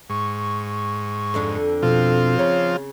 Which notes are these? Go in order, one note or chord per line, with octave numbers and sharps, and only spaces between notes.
G#2 C#6
F2 D3 D4
B2 F3 C4 F4
C#3 C#5